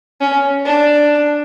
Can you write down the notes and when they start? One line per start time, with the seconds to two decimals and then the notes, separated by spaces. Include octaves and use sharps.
0.21 C#4
0.65 D4